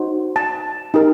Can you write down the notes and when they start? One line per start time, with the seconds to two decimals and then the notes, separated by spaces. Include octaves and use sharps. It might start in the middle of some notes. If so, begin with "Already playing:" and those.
Already playing: D#4 F#4 C5
0.36 A5
0.94 D#4 G4 A#4